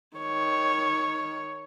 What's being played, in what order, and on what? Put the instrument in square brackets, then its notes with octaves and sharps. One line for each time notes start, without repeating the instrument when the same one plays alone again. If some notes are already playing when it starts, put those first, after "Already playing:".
[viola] D#3 C#5